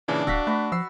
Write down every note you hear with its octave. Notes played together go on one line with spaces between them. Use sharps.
A#2 C#3 E3 D4
D1 F#4 D5 F5 E6 A#6 B6
A3 F#4 B4
F3 E6 C7